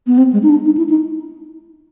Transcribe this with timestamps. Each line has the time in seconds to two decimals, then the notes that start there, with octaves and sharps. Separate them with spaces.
0.07 B3
0.18 C4
0.33 G#3
0.43 D#4
0.49 D4
0.65 D#4
0.77 E4
0.89 D#4